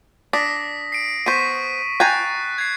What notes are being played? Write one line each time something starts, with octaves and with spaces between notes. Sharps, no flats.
D4 D#6 A#6 B6
C7 D7
B3 C5 C#6 B6 D#7
G5 G#5 A#5 F#6 A6 C7
G#6 C7